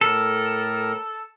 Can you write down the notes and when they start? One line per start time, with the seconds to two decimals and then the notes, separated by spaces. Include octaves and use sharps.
0.01 A2 A4 A#4